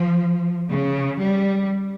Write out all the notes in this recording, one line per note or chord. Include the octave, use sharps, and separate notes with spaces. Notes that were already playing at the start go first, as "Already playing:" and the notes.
Already playing: F3
C#3
G3